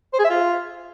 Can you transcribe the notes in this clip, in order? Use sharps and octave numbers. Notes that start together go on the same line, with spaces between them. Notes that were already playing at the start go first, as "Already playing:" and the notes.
C5
G#4
E5
F4